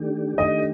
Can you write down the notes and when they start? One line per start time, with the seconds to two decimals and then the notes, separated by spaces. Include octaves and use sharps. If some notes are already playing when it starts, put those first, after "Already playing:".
Already playing: D#3 A3 D4 G4
0.38 D#3 A3 D4 G4 D#5